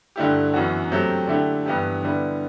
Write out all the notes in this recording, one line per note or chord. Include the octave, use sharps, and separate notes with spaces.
G2 D3 A3 E4 G4
F#2 E3 B3 F#4
C3 F#3 A3 C4 G4
D3 A3 E4 G4
G2 E3 B3 E4 G4
D3 G3 B3 E4